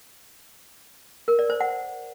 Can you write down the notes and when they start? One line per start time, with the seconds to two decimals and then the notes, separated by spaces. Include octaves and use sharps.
1.28 A#4
1.39 D5
1.50 C5
1.61 F#5